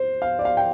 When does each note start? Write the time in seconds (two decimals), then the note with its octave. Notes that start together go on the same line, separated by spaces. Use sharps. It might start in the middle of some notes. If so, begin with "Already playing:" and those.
Already playing: C5
0.22 F5
0.39 D5
0.45 F5
0.57 G5